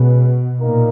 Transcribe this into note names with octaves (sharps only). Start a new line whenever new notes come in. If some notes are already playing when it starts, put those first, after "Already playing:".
Already playing: B2 G#3 C#4 G#4 B4
A#2 A#3 D#4 A#4